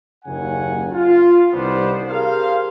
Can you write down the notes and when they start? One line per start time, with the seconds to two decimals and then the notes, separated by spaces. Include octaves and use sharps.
0.25 F#1 D#2 C#3 F#5 G#5
0.92 F4
1.53 C2 D#3 G3 B3 D4 C5
2.09 G4 G#4 A#4 C5 F5